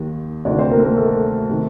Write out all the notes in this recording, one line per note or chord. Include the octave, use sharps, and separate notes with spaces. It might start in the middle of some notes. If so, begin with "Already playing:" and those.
Already playing: D#2 D#3
D2 C3 D#3 D4 D5
C4 C5
A#3 A#4
A4
A#3 A#4
A3 A4
C3 D#3